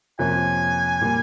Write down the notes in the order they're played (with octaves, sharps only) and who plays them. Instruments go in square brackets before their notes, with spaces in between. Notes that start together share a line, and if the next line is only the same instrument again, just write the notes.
[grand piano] F2 C3 F3 A#3 C#4 [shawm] G#5
[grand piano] A#2 G3 A#3